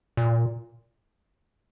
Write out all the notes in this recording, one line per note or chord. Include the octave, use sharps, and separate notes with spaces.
A#2